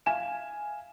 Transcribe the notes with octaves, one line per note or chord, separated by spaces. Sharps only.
E5 F5 G#5 E7